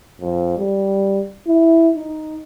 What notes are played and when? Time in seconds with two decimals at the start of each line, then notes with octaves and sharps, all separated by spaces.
0.21 F2
0.58 G3
1.47 E4
1.96 D#4